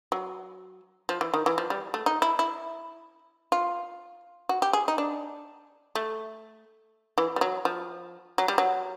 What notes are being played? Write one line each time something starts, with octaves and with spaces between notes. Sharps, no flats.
F#3
F3
E3
D#3
E3
F3
G3
A3
D#4
E4
E4
F4
F#4
G4
G#4
D#4
D4
A3
E3
G3
F#3
F3
F#3
G3
F#3